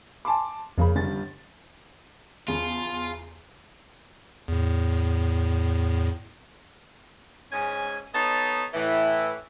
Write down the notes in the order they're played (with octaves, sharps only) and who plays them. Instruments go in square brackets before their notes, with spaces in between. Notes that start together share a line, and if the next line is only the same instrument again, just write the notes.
[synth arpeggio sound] G#5 B5 [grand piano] A5 C6 D6
[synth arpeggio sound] F2 F3 B5 [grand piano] C#3 A#3
[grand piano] G1 G3 A6 [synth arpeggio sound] C#4
[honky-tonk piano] E2 C#3 F3 [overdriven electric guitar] F4
[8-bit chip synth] E2 A2
[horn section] G#2 C#4 G#5
B3 D#4 A4 C#5 D#5 A5
A2 E3